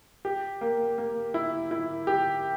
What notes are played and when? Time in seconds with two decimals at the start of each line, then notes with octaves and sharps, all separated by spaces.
0.25 G4
0.61 A#3
0.98 A#3
1.34 E4
1.71 E4
2.07 G4